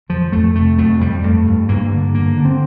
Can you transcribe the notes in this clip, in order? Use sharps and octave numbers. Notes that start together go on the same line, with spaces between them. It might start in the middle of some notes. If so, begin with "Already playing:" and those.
F2 F3
F2 A3
C3 A3
F2 A3
F2 G3
G2 A3
G2
G2 A#3
D3
D3 A#3
D3
C4